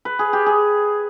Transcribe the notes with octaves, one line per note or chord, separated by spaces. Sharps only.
B4
G#4
G4
G#4